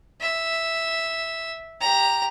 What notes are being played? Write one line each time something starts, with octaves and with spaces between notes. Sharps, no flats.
E5
G4 A#5